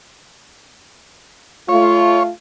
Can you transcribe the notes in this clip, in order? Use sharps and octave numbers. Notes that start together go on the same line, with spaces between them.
A3 F4 C#5